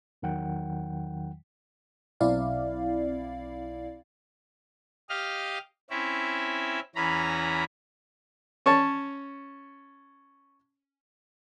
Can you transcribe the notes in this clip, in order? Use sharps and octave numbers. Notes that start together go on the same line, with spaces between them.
E2 D#3 F#3 F#5 G5
B1 C4 E4 D5 F5
G4 D#5 F5 F6
C4 C#4 E4 E5
E2 E3 C#4 A#5 B5
C#4 C#5 A5